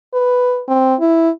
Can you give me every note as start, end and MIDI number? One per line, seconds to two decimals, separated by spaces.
0.14 0.62 71
0.68 0.95 60
1.00 1.30 64